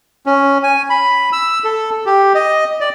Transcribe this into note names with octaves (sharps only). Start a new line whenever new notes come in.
C#4
G#5
B5
E6
A4
G4
D#5
D5